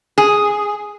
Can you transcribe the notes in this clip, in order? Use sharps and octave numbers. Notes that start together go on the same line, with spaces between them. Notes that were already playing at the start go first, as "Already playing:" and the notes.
G#4